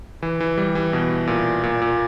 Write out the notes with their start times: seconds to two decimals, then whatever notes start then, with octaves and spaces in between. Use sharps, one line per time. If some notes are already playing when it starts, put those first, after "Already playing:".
0.22 E3
0.40 E3
0.57 G3
0.75 E3
0.93 B2
1.27 A#2
1.63 A#2
1.82 A#2